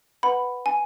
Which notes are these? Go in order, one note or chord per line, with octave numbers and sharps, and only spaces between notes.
B4 F#5 B5
G#5